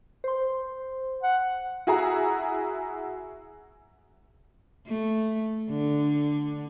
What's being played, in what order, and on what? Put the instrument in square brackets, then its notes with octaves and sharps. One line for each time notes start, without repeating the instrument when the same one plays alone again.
[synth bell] C5 C6
[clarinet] F#5
[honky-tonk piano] E4 F#4 G#4 F#5 A#5
[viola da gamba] A3
D3